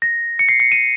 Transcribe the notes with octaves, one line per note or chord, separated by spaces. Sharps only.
A#6
C#7
C7
C#7
D#7